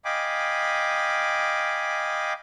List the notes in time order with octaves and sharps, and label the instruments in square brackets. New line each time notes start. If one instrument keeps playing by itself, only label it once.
[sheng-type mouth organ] D#5 F5 G5 G#5 B5 D6